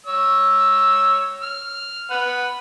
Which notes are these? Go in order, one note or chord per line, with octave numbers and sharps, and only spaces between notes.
C#5 E6
F6
B4 F#5